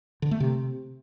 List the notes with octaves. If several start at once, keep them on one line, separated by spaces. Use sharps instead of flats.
D3
A3
C3